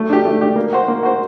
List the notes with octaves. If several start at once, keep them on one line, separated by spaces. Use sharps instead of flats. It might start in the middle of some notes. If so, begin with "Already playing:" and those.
Already playing: A3
D4 G4
A3
D4 G4
A#3
F#4 C5
A#3
F#4 C5